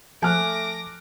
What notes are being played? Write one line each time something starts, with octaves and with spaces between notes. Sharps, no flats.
F3 A3 G#5 D6 F6 F#6 A#6